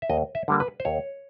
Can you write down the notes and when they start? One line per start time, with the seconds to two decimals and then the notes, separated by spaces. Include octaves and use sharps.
0.02 E5
0.10 D#2 D#5
0.35 E5
0.48 D3 G3 A#3
0.60 B4
0.80 C5
0.85 D#2 C#5